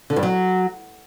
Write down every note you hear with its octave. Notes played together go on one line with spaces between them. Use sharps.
D3
G2
F#3